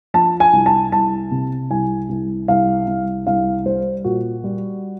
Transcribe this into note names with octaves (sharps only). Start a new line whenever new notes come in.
F3 A5
G#5
C2
A5
C2 A5
C3
C2 G#5
C2
C2 F5
C2
C2 F5
G3 C5
A#2 F#4
G3